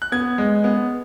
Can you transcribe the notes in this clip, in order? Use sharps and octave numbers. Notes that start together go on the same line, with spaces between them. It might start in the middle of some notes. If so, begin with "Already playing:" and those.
F#6
B3 G#6
G#3
B3